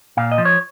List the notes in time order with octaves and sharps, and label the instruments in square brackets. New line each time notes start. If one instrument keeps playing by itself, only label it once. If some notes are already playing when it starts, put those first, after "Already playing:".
[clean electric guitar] A#2 F5
D#5
F3
C#5